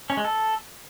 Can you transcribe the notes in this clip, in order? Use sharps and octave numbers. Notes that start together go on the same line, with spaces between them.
C#4
G#3
A4